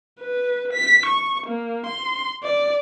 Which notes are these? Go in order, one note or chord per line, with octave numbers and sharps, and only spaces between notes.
B4
B6
C#6
A#3
C6
D5